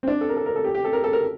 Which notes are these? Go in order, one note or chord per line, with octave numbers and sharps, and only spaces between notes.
C4
D4
A4
A#4
A4
A#4
A4
G4
G4
A4
A#4
A4
A#4